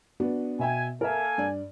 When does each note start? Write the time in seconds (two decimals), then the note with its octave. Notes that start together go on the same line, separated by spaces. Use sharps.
0.20 B3 D4 F#4
0.59 B2 E5 G5 G#5
1.01 A#3 A4 A#4 E5 G#5
1.38 G2 D5